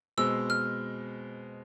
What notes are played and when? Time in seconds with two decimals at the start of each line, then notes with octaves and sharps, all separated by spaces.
0.18 B2 G#3 C4 E6
0.50 F6